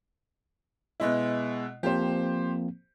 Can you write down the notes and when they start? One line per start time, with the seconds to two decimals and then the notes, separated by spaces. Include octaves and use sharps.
1.00 B2 G#3 E4
1.83 F3 A#3 C4 G4 C5